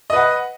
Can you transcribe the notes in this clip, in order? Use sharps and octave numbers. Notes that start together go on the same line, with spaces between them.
B4 D#5 F#5